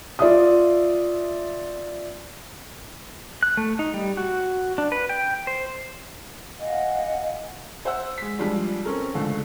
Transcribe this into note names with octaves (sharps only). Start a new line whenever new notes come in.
F4 D5 E5 D#6
F#6
A3
D#4
G3
F#4
D4
B4
G5
C5
D#5 F5 F#5 G#5
C5 E5 F#5 E6
G#3 B6
F3 G3 G#3 D4 F4
C4 C#4 A4 A#4
C#2 D3 A3